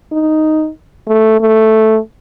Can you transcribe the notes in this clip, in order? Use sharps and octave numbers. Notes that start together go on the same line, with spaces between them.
D#4
A3
A3